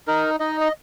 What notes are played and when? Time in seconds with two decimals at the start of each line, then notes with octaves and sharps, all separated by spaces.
0.07 D#4 A#4
0.40 D#4 D#5
0.61 D#5